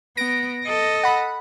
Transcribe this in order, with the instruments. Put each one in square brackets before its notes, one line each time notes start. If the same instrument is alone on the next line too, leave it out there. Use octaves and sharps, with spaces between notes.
[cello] B3 [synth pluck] A#6 D7
[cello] A4 D#5
[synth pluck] F#5 B5